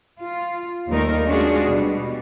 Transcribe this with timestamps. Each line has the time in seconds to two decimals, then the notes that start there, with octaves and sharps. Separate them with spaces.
0.21 F4
0.91 D#2 G3 A3 D#4 A#4
1.26 G#3 C#4 D4 F4 F#4 G#4
1.66 B2 G3